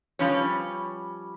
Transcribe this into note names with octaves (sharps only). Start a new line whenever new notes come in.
F3 G3 C#4 B4 C#5